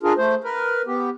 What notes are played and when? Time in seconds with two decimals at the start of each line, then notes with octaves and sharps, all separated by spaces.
0.03 D4 F4 G#4 A#4
0.18 A3 C5
0.44 A#4 B4
0.87 B3 G4